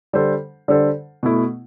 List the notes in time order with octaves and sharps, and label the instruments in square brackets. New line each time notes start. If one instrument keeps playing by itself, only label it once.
[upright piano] D3 G3 D4 A4 C5
D3 G3 D4 A4 C5
B2 A3 E4